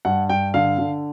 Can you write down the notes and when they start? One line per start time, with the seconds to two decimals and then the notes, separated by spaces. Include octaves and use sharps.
0.05 G2 F#5
0.29 G2 G5
0.54 D3 F5
0.78 D3